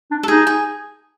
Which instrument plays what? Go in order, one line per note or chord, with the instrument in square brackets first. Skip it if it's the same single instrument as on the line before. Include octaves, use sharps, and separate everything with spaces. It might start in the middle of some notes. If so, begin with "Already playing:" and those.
[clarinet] D4
[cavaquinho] A4
[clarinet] D#4 [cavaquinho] G#4
[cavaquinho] G#4